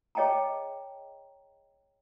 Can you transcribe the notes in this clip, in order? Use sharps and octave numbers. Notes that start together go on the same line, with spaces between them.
G#4 C#5 D#5 G5 A5 A#5